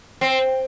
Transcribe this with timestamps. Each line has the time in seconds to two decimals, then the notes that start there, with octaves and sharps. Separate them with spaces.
0.21 C4